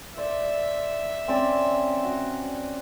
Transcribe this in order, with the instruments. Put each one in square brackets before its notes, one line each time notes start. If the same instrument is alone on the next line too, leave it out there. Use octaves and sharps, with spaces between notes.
[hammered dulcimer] C5 D5 [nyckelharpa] E5
[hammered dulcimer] C4 C#4 D5
F#4